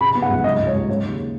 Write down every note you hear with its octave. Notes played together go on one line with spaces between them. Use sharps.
C#3 B5
B3
F#5
C#2
C#3 D#5
C#2
C#5
C#2
C#3 C#5
D#2